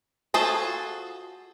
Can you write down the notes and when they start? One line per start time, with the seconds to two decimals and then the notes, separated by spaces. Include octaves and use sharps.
0.34 F4 F#4 G#4 A4 C5